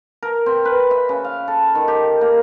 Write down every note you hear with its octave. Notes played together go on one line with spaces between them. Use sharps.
A#4
C4
B4
E5
C#3
F5
A4
D#3
G4
A#3